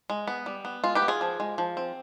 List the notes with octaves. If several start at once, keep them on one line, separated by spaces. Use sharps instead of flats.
G#3
B3
G3
B3
G#3 F4
G4 B4
B3
F4 G#4
F3
G#3
F3
C4